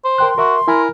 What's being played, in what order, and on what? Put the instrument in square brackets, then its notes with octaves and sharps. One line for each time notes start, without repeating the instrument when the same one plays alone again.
[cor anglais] C5
[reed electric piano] A#4 G5 F#6 [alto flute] C6
[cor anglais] F#4 [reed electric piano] A#4 E5
[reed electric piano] E4 G#5 B5 [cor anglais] A#4